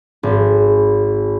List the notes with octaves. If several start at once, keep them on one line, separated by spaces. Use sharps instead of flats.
G#1